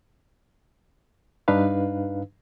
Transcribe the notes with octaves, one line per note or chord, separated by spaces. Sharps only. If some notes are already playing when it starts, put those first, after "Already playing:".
G2 D4 D#4 B4 F5